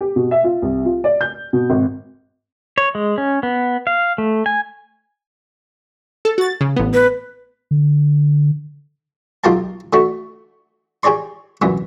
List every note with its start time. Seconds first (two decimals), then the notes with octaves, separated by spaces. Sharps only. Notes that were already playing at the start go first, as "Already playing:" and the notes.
0.01 G4
0.16 B2
0.31 E5
0.44 F4
0.62 C2
0.85 F4
1.04 D5
1.21 G6
1.53 B2
1.70 G#1
2.78 C#5
2.95 G#3
3.18 C#4
3.43 B3
3.87 F5
4.18 A3
4.46 G#5
6.25 A4
6.38 F#4 A6
6.61 C#3
6.76 A1 B3
6.94 B4
7.71 D3
9.44 B1 F4 G4 A#4 F5 A5
9.93 D3 A3 F#4
11.03 G4 G#4 C#5 D5 C6
11.62 C2 F#2 A#2 E3 B3